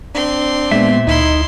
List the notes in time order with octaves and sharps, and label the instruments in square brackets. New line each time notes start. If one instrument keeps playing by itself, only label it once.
[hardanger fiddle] C4 C6 [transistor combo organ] D4
[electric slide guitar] A#2 E5 [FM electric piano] G#3 B3
[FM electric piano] D2 [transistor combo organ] D#4 [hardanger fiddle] E4 C6